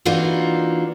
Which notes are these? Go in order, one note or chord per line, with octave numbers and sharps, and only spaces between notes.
E3 A#3 D4 D#4 F4 F#4